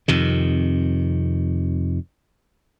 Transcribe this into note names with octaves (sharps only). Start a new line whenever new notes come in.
F2 C3 D#3